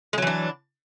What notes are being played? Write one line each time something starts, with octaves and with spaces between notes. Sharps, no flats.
E3 F#3 G#3 D4